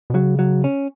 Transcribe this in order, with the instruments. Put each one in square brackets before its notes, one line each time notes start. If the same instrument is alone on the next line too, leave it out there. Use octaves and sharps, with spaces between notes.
[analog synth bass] B2
[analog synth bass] C#3 [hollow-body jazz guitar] F#3
[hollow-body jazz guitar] F#3
C#4